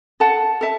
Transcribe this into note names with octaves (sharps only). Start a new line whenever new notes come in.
A4 F#5 A5
A4 E5 A5